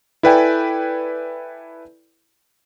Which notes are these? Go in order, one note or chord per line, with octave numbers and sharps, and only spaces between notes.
E4 A4 B4 D5 G5 G#5